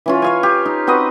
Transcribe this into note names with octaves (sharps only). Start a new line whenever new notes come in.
E3 C#4 F4
C#5 F5 G#5
G4
D#4
C4 F#4 B4 D#5